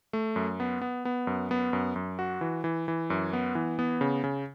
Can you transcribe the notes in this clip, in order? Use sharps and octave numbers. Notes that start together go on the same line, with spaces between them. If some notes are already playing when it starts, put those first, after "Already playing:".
A3
F#2
B3
B3
B3
F#2
B3
F#2
F#2
F#4
E3
E3
E3
F#2
B3
E3
B3
C#3
C#3